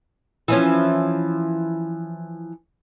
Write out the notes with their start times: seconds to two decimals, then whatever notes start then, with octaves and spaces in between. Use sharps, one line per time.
0.48 E3 F3 C#4